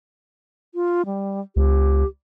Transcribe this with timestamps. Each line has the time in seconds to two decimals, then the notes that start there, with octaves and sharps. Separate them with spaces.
0.75 F4
1.06 G3
1.56 C#2 G4